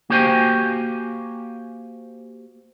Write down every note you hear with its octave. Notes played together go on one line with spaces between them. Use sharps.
A#3 F#4 G4 C5 G5 G#5